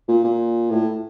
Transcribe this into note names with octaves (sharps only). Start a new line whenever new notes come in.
A#2
A#2
A2